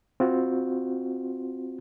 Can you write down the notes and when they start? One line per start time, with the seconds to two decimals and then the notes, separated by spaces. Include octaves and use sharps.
0.20 C4 F4 F#4